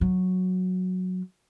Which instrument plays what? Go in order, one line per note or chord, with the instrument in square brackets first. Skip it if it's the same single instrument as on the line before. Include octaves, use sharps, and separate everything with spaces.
[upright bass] F#3